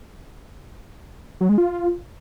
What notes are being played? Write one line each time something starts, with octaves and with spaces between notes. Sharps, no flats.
F#3
G#3
F4